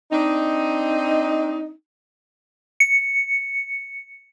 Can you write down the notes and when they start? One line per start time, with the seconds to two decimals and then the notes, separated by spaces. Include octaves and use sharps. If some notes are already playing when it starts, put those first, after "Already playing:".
0.12 C4 D4 D#4
2.80 C#7